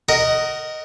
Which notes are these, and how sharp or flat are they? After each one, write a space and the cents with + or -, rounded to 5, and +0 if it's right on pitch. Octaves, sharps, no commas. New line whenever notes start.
A#4 -10 D#5 +0 F#5 +20